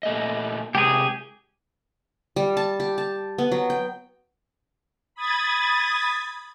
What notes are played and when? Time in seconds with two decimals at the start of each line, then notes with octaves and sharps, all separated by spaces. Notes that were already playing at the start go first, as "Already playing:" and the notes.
0.03 A#2 A3 D#5
0.75 C3 G#3 G4 G#4 G#5
2.36 G3
2.57 A5
2.80 G4
2.98 A5
3.38 B3
3.52 F#3
3.70 G5
5.15 B5 D#6 G#6 A6